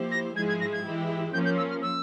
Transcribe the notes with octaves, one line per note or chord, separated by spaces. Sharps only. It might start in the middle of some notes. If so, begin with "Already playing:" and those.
Already playing: F3 A#3 E4 G4 C5
A#6
G#2 F3 G#3 E4 G#4 G#6
G#6
A#6
G#6
E3 G#3 E4 G4
F3 A#3 C#4 G6
G6
E6
F6
E6